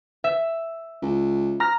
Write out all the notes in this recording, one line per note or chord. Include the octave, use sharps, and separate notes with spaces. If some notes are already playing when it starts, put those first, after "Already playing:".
E5
C#2
A#5 F6 A#6